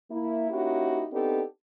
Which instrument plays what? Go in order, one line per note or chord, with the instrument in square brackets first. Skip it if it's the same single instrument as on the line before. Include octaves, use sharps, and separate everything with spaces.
[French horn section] A#3 E4
A#3 C#4 D#4 E4 F#4 G4
B3 C4 D4 D#4 G4 A4